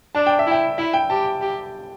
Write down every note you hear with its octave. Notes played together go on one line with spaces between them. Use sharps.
D4 A5
G5
E5
E4
G5
E4 E5
G5
G4 A5
G4